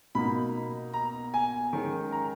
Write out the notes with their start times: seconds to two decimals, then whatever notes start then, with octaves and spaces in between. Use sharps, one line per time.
0.15 B2 A#3 D#4 B5
0.94 A#5
1.34 G#5
1.73 D#3 G#3 C#4
2.12 A#5